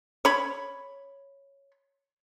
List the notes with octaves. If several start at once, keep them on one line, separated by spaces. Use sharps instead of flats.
C#5 B5